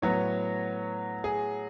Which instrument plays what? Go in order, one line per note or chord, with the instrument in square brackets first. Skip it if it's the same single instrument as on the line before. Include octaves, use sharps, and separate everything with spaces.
[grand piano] A2 F#3 B3 C#5
G#4